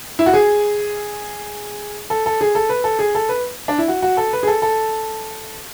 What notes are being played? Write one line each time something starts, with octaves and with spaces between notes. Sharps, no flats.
E4
F#4
G#4
A4
A4
G#4
A4
B4
A4
G#4
A4
B4
D4
E4
F#4
F#4
A4
B4
G#4
A4
A4